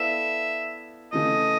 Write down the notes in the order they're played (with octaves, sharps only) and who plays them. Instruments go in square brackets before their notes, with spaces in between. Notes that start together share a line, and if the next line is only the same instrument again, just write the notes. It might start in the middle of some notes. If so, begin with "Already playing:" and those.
Already playing: [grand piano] B3 E4 A4 D5 F5 [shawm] E5
[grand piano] C#3 E3 A3 [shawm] D#5